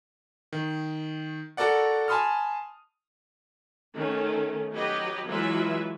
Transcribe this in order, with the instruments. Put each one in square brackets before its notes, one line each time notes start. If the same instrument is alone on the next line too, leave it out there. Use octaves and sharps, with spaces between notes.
[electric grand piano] D#3
F#4 A4 A#4 D5 F#5
G#5 A5 B5 C6 D#6 F6
[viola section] D#3 A3 C#4
F#3 G4 B4 D#5
E3 F#3 G#3 F4 B4 E5